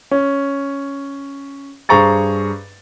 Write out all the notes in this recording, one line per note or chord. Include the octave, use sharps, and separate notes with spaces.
C#4
G2 G#4 C5 A#5 C#6 A6